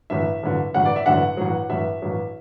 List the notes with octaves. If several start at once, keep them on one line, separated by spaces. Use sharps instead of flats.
A1 G2 D3 F#3 E5
A1 G2 D3 F#3
A1 G2 D3 F#3 F#5
D5
E5
A1 G2 D3 F#3 F#5
A1 G2 F#3
A1 G2 F#3 E5
A1 G2 F#3